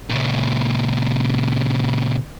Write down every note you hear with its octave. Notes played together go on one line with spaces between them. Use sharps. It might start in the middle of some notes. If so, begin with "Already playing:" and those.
A#2 C#3